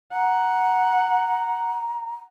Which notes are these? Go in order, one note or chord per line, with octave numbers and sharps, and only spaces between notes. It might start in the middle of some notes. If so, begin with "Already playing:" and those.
F#5 A#5